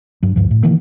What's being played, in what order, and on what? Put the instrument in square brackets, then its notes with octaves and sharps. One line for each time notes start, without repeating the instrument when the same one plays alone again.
[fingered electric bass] G2 F#3
D2 G2 F3
A2
B2 D#3 E3 A#3